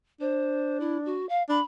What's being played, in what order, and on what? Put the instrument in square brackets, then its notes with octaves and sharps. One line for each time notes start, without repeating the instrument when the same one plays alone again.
[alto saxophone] D4 [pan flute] C5
[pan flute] E4
F#4
F5
[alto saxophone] D4 [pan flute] B5